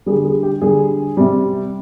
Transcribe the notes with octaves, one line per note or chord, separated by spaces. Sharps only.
D3 G3 G#4
G#4
G4
D3 G3 G#4
C3 G3